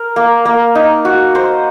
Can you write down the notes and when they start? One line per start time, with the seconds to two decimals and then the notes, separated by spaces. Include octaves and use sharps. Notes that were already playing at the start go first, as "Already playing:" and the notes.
Already playing: A#4
0.16 A#3
0.45 A#3
0.75 D#4
1.05 F#4
1.35 C5